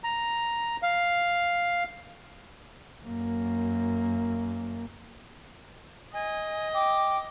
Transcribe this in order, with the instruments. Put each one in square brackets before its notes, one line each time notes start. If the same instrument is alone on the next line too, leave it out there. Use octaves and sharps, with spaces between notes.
[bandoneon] A#5
F5
[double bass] F#2 A#3
[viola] D#5 [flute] G#5
[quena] G5 [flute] D6